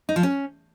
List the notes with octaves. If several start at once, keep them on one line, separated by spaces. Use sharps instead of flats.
D#4
F3
C#4